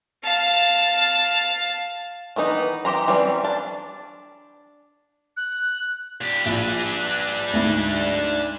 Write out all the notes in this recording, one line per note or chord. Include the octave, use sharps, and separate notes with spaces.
F5 A5
D#3 E3 B3 D#4
E3 G4 C5 A#5
E3 F#3 G3 C4 C#4
D4 A5
F#6
A#2 G4
A#1 D4 B4
D2 G#2